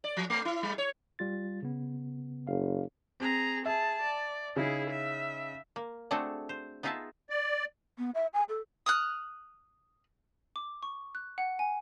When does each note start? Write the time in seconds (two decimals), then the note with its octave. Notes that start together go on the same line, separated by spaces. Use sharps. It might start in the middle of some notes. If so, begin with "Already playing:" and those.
0.04 D5
0.17 F3
0.30 A3
0.45 E4
0.63 G3
0.78 C#5
1.19 G3 F4 A6
1.62 C#3 B3
2.47 F#1 F5
3.20 C4 G#4 A#5
3.66 G#4 E5 A5
4.02 D5
4.56 C#3 D#4 E4 G#4
4.90 E5
5.76 A#3
6.11 A3 C4 D4 F#4 G#4 A4
6.49 C5
6.83 B3 D#4 F4 G#4 E5 A5
7.30 D5
7.98 B3
8.15 E5
8.34 G#5
8.49 A4
8.86 D#6 F6 F#6
10.56 D6
10.83 C#6
11.15 F#6
11.38 F#5
11.59 G#5